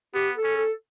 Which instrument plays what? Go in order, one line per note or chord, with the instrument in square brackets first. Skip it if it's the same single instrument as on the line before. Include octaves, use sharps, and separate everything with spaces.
[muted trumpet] B3 [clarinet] G4
[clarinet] A4
[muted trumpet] C#4
[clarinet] A4